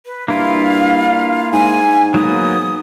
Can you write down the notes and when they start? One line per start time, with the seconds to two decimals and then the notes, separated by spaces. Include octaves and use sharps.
0.06 B4
0.28 G2 A#3 E4 F4 F5
1.52 G#2 G#5
2.14 G#2 F#3 A#3 B3 D#6